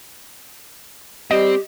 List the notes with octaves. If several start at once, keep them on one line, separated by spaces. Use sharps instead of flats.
G3 C4 G4 D#5